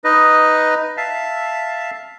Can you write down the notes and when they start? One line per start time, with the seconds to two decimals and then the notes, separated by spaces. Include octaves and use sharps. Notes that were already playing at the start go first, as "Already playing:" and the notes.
0.04 D#4 B4 D#5
0.97 E5 F5 A5